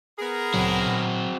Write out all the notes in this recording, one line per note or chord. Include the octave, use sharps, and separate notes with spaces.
B3 G#4 A#4
D2 A#2 C#3 F#3 C4 F#4
A#2